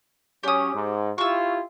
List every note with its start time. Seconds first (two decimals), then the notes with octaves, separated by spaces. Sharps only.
0.43 F#3 C#4 G4 D#6
0.73 G#2
1.18 E4 F4 G4 C#6 E6